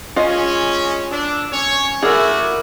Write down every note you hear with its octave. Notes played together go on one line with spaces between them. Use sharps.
G#3 C#4 F4 D#5
D4 E6
C#4 C#5
A3 E4 F#4 G#4 A#4 D5